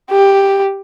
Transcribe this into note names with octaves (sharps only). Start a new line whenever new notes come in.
G4